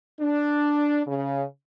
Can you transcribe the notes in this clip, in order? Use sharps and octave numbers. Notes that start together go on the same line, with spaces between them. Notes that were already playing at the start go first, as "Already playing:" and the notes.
D4
C#3